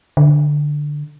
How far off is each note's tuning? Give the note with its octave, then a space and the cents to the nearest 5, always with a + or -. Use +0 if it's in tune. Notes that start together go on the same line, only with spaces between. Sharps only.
D3 +5